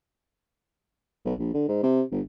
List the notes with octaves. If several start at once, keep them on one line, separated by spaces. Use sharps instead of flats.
B1
A#1
D3
G#2
C3
G1